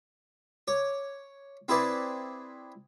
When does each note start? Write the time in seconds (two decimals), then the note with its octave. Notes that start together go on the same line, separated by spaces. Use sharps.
0.68 C#5 D6
1.68 C4 E4 G#4 B4 D5